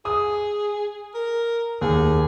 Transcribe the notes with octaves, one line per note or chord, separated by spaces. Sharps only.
G#4 D#6
A#4
D#2 G#4